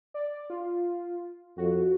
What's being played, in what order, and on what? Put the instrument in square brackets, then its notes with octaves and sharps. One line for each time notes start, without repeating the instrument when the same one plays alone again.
[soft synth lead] D5
F4
[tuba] F2 [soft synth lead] F#4